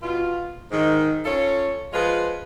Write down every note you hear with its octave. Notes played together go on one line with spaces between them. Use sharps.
B2 F4
G#2 D#3
C#4 F4 A4 C#5
F3 G#3 F4 G#4 B4